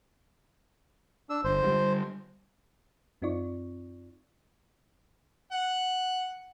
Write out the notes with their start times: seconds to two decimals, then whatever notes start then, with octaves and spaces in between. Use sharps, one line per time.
1.30 D4 E6
1.44 G1 C5
1.62 D3 F3 G3
3.22 F#2 C4 D#4 F4 D5 C#6
5.52 F#5